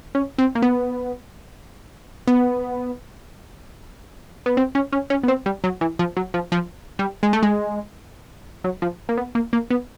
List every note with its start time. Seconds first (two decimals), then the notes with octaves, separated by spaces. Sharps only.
0.15 C#4
0.38 C4
0.55 A#3
0.62 B3
2.28 B3
4.46 B3
4.57 C4
4.75 C#4
4.92 C#4
5.10 C#4
5.23 B3
5.28 C4
5.46 G3
5.64 F#3
5.81 E3
5.99 F3
6.17 F#3
6.34 F3
6.52 F3
6.99 G3
7.23 G#3
7.33 A3
7.43 G#3
8.64 F#3
8.82 F3
9.09 A#3
9.17 B3
9.35 A#3
9.53 A#3
9.70 B3